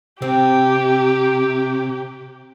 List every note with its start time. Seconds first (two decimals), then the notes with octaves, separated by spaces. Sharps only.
0.22 C3 C4 G4